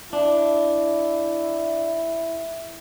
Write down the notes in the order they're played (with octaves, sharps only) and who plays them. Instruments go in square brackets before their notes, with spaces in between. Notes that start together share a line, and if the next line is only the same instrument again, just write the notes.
[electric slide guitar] D4 [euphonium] E4